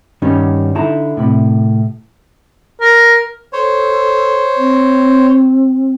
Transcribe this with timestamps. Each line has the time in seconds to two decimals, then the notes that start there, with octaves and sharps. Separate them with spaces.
0.22 G2 D#3 G3 B3 C#4 D#4
0.75 D3 D#4 E4 A5 A#5
1.17 A2 C3 B5
2.81 A#4
3.53 A4 C5 C#5
4.56 C4